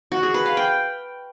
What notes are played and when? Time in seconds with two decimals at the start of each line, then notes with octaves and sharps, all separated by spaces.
0.12 F#4
0.23 G#4
0.34 B4
0.46 F5
0.57 G5